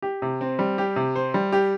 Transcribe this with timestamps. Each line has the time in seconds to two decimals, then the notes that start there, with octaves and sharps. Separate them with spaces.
0.02 G4
0.22 C3
0.41 C4
0.59 G3
0.78 G4
0.96 C3
1.16 C5
1.34 G3
1.52 G4